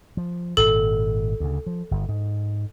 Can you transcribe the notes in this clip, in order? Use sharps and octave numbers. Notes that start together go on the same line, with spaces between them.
F3
G#1 A#2 A4
D2 C#3
F3
G1
G#2